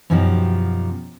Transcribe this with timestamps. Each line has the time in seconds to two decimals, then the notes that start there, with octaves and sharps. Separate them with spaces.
0.10 F#2 B2 F3 D#4 F#4 G4